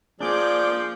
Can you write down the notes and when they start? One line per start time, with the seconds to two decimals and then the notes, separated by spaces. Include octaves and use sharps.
0.20 F3 A#3 D4 G#4 D5 D6 G6